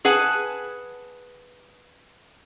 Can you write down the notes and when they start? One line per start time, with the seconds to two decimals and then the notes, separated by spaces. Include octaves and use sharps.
0.05 G#4 B4 F#5 G#5 A5